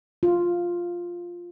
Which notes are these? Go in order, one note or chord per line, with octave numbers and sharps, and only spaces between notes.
F4